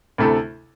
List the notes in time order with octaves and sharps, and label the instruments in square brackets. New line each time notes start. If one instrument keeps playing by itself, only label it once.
[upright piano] D2 C3 A3 E4 A4